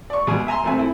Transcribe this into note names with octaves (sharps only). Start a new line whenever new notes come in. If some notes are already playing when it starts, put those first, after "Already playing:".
D5 C#6
B2 G#3 G#4 G#5
E5 G#5 A#5 C6
G#1 A3 C4 E5 G#5
E4